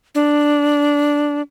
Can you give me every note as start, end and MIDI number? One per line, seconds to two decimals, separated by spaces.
0.15 1.42 62